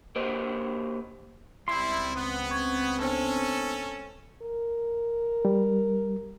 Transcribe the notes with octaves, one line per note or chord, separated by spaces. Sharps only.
A#3 G4 C5 D#5
C#2 G3 C4 E4 C6
B3
C#6 G#6
B3 C#4 D4 A4 C5
A#4
G3